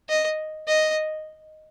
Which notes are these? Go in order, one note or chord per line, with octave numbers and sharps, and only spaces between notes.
D#5
D#5